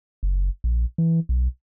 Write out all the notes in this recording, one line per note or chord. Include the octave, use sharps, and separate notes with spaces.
F#1
A#1
E3
B1